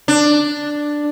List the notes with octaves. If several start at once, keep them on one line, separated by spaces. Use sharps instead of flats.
D4